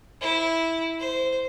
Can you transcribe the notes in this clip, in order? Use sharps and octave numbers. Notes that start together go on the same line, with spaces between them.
E4
C5